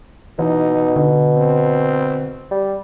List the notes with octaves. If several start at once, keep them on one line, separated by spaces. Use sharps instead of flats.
B2 E3 D#4
D3
C4
G3